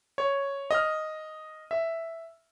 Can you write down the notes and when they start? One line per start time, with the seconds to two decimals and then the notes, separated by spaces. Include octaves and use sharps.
0.18 C#5
0.71 D#5 F6
1.71 E5